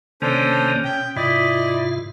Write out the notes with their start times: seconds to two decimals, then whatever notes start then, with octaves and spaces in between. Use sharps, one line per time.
0.22 C3 D#3 A#3 C#4 D4 A4 C5
0.84 B2 G5
1.17 G#2 C3 E4 F4 D5 D#5